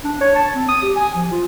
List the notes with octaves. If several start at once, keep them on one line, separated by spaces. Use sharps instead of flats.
D4
C#5
A5
C4
D#6
G4
G#5
F3
F4